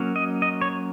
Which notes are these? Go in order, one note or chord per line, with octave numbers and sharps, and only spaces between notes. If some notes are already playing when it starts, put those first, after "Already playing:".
Already playing: F#3 A#3 C#4
D#5
D#5
C#5